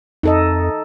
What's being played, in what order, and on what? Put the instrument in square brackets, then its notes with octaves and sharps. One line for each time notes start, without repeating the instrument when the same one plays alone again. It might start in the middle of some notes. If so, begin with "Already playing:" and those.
[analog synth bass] F2 [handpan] D#4 A4 D#5